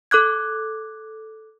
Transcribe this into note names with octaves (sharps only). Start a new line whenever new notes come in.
A4 D6 F#6 G#6